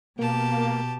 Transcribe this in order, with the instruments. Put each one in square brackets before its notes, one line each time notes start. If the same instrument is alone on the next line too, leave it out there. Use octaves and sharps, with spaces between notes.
[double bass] B2 [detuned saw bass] A#3 [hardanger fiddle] G4 A5